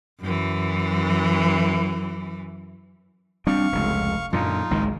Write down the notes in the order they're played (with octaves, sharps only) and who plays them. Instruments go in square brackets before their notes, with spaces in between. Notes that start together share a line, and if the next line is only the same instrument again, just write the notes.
[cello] F#2 E3
[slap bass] G3 C4 D4 [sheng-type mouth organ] F5 C#6
[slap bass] F1 C#2
[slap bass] F#2 A#2 D3 [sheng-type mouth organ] D#4 F4
[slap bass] G#1 C#2 D#3